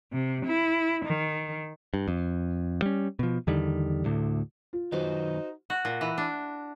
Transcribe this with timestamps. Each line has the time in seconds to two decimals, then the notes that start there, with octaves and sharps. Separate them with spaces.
0.13 C3
0.44 E4
1.04 D#3
1.94 G2
2.08 F2
2.82 G3 C#4
3.19 B2 F3
3.47 E2 D3 D#3 G3
4.05 D2 A2 D3
4.73 F4
4.92 F#2 D#3 D#4 F#4 B4 C5
5.70 F#4
5.85 A#2
6.01 E3
6.18 D4